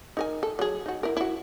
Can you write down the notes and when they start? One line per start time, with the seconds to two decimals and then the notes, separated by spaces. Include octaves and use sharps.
0.17 D#4 A#4 G#5
0.43 A4
0.59 F#3 G#4
0.86 D#4 F#4
1.03 E4 A#4
1.17 E4 F#4